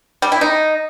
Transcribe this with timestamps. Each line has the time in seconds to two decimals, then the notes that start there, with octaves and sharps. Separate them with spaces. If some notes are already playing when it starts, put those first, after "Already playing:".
0.22 G3
0.32 E4
0.41 D#4